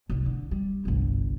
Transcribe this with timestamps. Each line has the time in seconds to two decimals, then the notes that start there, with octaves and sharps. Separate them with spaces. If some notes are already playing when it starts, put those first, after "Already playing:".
0.10 C2 D#3
0.26 D3
0.51 G3
0.85 G1 C2